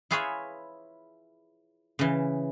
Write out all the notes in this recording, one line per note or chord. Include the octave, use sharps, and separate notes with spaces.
E4 F4 G#4 B4 C#5 E5
C#3 E3